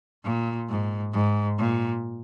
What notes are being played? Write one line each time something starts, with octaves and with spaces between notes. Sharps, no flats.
A#2
G#2
G#2
A#2